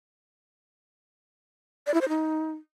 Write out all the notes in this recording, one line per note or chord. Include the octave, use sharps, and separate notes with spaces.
D5
E4
C5
D#4